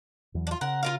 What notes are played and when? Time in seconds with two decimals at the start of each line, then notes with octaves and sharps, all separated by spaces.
0.34 E2 E3 F#3
0.47 D4 F4
0.61 C#3 A#4 F#5
0.83 F4 A#4 F5